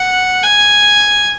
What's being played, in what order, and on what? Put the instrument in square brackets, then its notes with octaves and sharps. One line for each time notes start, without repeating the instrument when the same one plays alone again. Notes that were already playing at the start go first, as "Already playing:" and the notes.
Already playing: [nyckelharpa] F#5
G#5